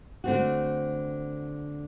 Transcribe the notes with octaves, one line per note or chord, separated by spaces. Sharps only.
D3 A3 C4 F#4